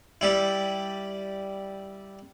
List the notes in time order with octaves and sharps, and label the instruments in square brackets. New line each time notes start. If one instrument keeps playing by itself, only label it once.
[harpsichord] G3 E4